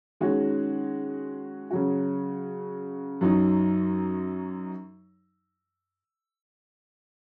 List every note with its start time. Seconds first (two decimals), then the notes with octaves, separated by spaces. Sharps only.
0.21 D#3 G#3 C#4 F#4
1.71 C#3 F#3 C#4 F#4
3.21 F#2 F#3 D#4